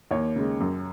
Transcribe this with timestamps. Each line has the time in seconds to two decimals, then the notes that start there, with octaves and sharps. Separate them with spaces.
0.11 D#2 C#5
0.36 C#3 G#3
0.60 F#2